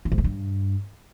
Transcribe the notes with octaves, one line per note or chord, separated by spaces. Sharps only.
D3
G#2
B2
G2